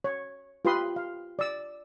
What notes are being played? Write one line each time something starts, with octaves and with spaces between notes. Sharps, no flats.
C#5
F4 G4 B4 B5 C6 D#6
F5
D5 E6